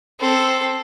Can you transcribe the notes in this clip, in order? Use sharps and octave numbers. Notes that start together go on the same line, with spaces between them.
C4 A4